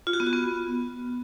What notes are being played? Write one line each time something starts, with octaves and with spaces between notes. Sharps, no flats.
F4
F#4
B3
F#4
B3